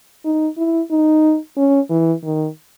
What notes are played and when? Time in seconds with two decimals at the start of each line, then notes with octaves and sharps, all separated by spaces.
0.25 D#4
0.57 E4
0.91 D#4
1.57 C#4
1.90 E3
2.24 D#3